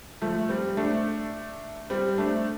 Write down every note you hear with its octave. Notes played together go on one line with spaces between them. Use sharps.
F3 A3
G3 C4
A3 D4
G3 C4
A3 D4